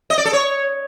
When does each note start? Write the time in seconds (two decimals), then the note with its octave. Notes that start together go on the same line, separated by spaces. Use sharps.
0.10 D#5
0.18 D5
0.25 A4
0.33 C#5